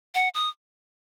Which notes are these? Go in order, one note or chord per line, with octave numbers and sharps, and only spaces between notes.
F#5
D#6